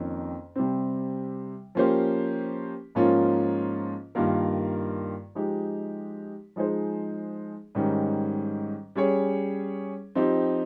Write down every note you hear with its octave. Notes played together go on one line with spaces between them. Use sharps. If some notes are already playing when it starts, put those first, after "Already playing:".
Already playing: F2 D#3 A#3 C#4
C3 G3 C4
F3 A#3 C#4 G4 C5
G#2 F3 A#3 C#4 F4
G2 D#3 A#3 F4 A#4
F3 G#3 D#4 G4
F3 G#3 D#4 G#4 C5
G#2 D#3 G3 C#4
G3 C#4 G#4 C#5
F3 C4 D#4 G4